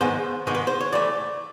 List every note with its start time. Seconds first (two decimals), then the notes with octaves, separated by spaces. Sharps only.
0.01 G#2 D#3 G#3 B3 C5
0.47 G#2 D#3 G#3 B3
0.55 B4
0.67 C5
0.80 C#5
0.93 E3 A3 D5